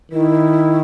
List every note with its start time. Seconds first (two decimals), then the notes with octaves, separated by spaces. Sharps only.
0.12 D#3 E4